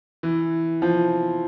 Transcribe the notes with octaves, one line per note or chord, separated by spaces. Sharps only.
E3
F3